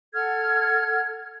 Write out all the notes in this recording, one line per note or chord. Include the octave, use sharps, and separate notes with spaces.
A4 F#5 F6 G#6